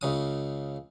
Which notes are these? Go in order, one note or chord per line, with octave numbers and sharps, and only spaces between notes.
C#2 C#3 D#6